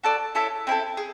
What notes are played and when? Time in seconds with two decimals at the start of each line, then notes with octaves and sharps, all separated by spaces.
0.04 F#4 A4 D5
0.35 E4 A4 C#5 E5
0.67 C4 E4 A4
0.97 G#4